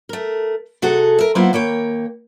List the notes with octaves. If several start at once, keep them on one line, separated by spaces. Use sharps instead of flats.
A3 A#4
C3 F#4 G#4 A4
A#4 E5
F#3 A#3 B3 E4 F4 C5
D#2 A#3 C#5 G5